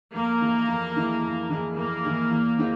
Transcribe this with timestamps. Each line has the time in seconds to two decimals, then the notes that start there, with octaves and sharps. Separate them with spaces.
0.14 F2 A#3
0.41 E3 G#3 E4 G#4
0.68 F2
0.96 E3 G#3 E4 G#4
1.22 F2
1.50 E3 G#3 E4 G#4
1.77 F2 A#3
2.05 E3 G#3 E4 G#4
2.31 E2
2.58 E3 G#3 C4 F4